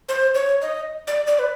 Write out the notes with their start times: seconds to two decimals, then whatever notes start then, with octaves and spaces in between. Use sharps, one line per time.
0.09 C5
0.35 C#5
0.62 D#5
1.07 D5
1.27 D5
1.39 B4